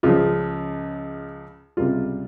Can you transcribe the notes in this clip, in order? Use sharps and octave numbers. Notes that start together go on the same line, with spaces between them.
C#2 C#3 F3 F4
C#2 C3 G3 F4